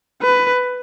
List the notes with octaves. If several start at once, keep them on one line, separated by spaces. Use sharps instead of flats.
B4